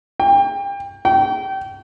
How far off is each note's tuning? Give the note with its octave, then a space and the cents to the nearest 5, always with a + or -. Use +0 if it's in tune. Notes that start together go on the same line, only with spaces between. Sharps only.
G5 +30
G5 -25